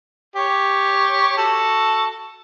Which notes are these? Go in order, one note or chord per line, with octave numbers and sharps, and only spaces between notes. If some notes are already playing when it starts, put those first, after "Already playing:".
G4 C#5
F#4 A4